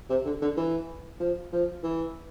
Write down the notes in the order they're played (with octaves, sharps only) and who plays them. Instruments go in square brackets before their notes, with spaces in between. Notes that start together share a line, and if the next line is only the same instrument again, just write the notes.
[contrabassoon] C3
D3
D3
E3
F3
F3
E3